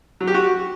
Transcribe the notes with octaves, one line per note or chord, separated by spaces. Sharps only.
F#3
G4
F#4